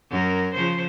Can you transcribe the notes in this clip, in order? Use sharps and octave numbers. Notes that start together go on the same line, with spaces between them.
F#2 A#4
C#3 F3 C5